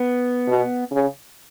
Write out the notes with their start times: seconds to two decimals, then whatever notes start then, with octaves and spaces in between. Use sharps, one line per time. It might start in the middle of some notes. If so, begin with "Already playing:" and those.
Already playing: B3
0.48 B2
0.91 C#3